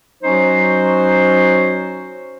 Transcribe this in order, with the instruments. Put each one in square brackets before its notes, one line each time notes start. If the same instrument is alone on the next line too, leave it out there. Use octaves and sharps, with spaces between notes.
[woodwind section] F#3 C#4 D#4 F#4 C5